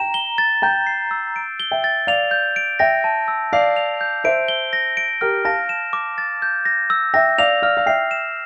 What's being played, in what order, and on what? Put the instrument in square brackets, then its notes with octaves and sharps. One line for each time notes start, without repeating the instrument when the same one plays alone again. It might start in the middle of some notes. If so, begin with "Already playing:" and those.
Already playing: [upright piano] G5 A#5 [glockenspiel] E7
[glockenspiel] G7
A6
[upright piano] G5 A#5 [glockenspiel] G6
[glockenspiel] C7
E6
D7
G7
[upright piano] E5 G5
[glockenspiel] A6
[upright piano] D5 F5 [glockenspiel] F7
[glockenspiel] G6
D7
[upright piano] E5 G5 [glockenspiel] A#6
[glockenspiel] A5
E6
[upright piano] D5 F5 [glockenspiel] C7
[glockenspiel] F7
G6
[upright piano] C5 E5 [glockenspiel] D7
[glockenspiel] G7
A#6
D7
[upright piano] G4 A#4 [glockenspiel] F6
[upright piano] F5 A5 [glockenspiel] A#6
[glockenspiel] E7
D6
A6
G6
A#6
E6
[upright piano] E5 G5 [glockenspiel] A#6
[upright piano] D5 F5 [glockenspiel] F7
[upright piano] D5 F5 [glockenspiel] F6
[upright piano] F5
[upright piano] E5 G5 [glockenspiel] C7
[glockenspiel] E7